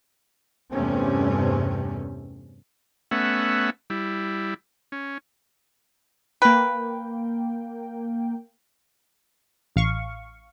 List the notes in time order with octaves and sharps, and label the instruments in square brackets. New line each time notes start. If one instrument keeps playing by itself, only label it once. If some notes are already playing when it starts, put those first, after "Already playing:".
[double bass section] E2 G2 C3 A3 C4 C#4
[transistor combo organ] A3 B3 C#4 E5 F#5
G3 E4
C#4
[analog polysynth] A#3 G5 [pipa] B4
[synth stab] A1 F5 C#6